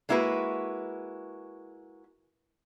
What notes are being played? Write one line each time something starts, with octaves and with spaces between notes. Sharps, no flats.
G#3 A#3 E4 F#4 A4 B4